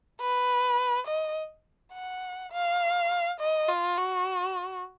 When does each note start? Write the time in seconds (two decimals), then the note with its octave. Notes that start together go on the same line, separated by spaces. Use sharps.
0.21 B4
1.07 D#5
1.94 F#5
2.52 F5
3.41 D#5
3.69 F4
3.98 F#4